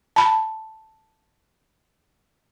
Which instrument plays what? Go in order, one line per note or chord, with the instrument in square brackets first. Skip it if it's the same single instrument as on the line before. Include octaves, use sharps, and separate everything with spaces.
[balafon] A5 B5